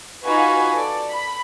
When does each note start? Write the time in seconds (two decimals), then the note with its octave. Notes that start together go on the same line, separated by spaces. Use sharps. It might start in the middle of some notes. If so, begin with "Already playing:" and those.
0.24 D#4 F4 F#4 B4 G#5
0.73 A4 D5
1.10 B5